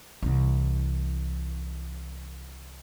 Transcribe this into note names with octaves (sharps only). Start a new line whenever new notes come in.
C2 E3